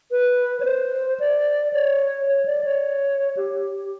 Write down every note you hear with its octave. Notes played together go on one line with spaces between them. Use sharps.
B4
C#5
C5
D5
C#5
C#5
D5
C#5
G4